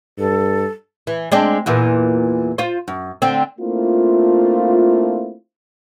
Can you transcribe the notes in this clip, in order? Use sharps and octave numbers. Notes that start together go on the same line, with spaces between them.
G2 A4
E3
G#3 C4 D4
E2 A#2 E3
F4 C5
F#2
D3 C4
A3 A#3 C4 D4 E4 F4